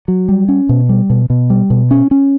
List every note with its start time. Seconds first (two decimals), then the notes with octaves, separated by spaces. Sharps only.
0.08 F#3
0.29 G3
0.48 C#4
0.69 B2
0.89 G3
1.10 B2
1.30 B2
1.50 G3
1.70 B2
1.91 C#4
2.11 C#4